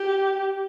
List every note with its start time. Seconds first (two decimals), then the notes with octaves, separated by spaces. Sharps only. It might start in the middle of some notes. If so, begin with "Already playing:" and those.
Already playing: G4